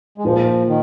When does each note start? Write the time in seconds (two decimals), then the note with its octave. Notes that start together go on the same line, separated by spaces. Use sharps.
0.18 G#3
0.24 A#2 F3 A#3 F4 G#4 C5
0.68 D#3